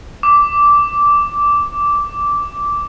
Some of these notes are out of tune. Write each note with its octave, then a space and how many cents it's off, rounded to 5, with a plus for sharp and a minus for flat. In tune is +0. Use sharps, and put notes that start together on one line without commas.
D6 -10